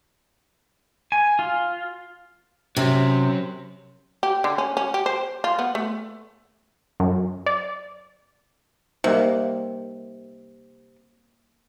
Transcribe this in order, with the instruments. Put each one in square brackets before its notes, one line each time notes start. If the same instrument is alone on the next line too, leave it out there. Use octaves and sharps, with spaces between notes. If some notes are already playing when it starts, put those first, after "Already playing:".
[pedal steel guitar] G#5
F4
[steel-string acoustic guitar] C3 [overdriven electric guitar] F#3 C#4
[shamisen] G4
D3
C#4
C#4
G4
C5
F4
B3
A3
[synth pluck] F#2
D5
[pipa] C3 [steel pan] G3 A#3 D#4